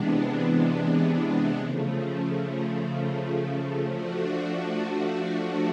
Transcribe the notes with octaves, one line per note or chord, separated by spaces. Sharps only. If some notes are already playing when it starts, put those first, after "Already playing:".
Already playing: C3 E3 G#3 B3 D4
C#3 F3 A3
F3 A3 D4 F#4